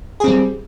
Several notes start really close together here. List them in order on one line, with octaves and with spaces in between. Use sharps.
G#4 C4 G3